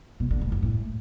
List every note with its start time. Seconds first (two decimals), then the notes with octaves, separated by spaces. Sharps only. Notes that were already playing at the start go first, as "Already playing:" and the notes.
0.20 B2
0.31 D3
0.41 G#2
0.52 F#2
0.63 A2